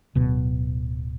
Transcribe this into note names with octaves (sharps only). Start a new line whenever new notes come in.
D1 B2